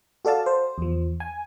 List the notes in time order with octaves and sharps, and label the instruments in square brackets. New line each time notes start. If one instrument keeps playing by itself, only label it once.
[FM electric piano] F#4 A4 D5 F5 A5
C5
E2 F3
G#5